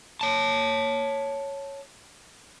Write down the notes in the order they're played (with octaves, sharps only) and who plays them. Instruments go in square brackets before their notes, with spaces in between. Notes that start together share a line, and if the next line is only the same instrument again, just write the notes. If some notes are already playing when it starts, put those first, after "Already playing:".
[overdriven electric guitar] C#5 A5